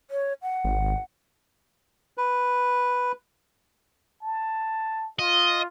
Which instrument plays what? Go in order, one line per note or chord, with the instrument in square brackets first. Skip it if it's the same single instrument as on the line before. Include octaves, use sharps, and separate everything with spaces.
[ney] C#5
F#5
[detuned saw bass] G#1
[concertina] B4
[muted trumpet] A5
[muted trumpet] F4 [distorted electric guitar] D#5